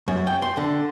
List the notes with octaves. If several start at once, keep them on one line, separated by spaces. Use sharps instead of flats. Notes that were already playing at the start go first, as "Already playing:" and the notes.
F#2
G5
C6
D3